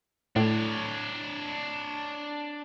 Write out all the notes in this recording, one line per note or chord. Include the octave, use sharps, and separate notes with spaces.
A2 D4 C#5